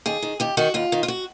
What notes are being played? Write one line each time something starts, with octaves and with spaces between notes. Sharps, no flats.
D#2 G#4
D#3
D#2 G4
D#3 F#4
D#2 F4
D#3
F4
F#4